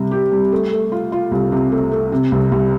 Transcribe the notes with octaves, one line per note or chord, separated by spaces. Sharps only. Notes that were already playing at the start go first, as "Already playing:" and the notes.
Already playing: C3 G3
G4
G3
A3
A3
F4
F4
C2
C3
A3
A3
C3
C2
C2